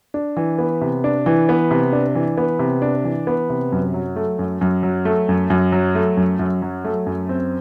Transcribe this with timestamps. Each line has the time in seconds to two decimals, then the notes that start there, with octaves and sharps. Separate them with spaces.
0.14 D4
0.36 E3
0.58 B3
0.81 C3
1.04 D4
1.26 E3
1.49 B3
1.71 C3
1.93 D4
2.15 E3
2.37 B3
2.59 C3
2.82 D4
3.04 E3
3.27 B3
3.50 C3
3.72 F#2
3.94 F#3
4.16 A3
4.39 F#2
4.61 F#2
4.83 F#3
5.05 A3
5.29 F#2
5.50 F#2
5.72 F#3
5.95 A3
6.17 F#2
6.39 F#2
6.62 F#3
6.84 A3
7.07 F#2
7.29 C4